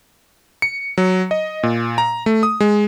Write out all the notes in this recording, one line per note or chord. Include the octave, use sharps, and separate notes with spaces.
C#7
F#3
D#5
A#2
A#5
A3
D#6
G#3